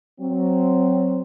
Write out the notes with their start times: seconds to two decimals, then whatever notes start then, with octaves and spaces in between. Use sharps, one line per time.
0.20 F#3 C4